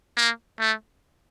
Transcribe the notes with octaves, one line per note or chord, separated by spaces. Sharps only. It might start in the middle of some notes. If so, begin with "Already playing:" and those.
A#3
A3